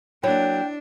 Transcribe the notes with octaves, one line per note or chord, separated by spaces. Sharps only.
F#3 A#3 D4 E4 C#5 G5